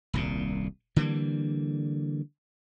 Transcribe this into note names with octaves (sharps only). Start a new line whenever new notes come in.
D#1 C2 A#2
D3 E3 G3 A#3